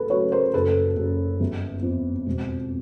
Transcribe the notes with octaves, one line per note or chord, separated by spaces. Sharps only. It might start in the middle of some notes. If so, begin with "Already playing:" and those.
Already playing: A1 A4 B4
F#3 B4 C#5
A#4 C5
F#1 A4 B4
F#1
G1
F2
E1